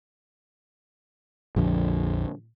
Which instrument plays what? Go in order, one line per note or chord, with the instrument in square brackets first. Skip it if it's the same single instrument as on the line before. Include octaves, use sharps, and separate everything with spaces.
[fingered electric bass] A#1 F2 D3